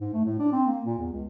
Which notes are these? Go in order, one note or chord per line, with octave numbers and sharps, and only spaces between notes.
G#2
A3
A2
D4
C4
A#3
A#2
E2
C#2